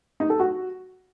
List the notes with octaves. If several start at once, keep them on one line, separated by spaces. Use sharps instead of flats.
D#4
A4
F#4